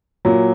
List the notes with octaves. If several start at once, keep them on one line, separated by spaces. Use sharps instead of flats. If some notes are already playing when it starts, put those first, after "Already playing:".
A#2 F#3